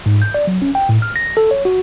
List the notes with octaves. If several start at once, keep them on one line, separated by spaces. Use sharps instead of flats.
G#2
G6
D5
F#3
C#4
G5
A2
F6
A#6
A4
C#5
F#4